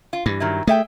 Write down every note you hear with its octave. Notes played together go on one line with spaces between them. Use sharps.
F4
G2 E3
D#3 F#3 E4
A3 G#4 E5 G5